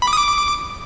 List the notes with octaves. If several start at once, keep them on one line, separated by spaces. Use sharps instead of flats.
B5
D6
D#6
D6